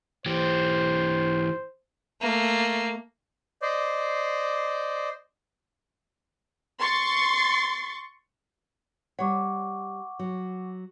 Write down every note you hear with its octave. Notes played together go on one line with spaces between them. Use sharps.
E3 G4 C5
A3 A#3
C5 D5 D#5
C6 C#6 A6
G3 C#5 F#5 C#6 D6
F#3